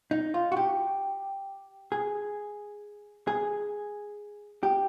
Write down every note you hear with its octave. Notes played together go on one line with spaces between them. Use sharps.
D#4
F4
F#4
G4
G#4
G#4
G4